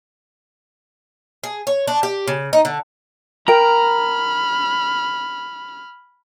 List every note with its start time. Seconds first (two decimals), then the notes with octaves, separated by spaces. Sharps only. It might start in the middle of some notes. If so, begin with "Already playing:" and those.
1.44 G#4
1.67 C#5
1.88 D4
2.03 G4
2.28 C#3
2.53 D#4
2.65 D3
3.48 A#4 G5 A#5 B5 F6